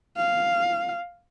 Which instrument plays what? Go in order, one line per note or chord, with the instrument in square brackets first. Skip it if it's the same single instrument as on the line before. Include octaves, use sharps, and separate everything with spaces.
[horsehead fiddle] F5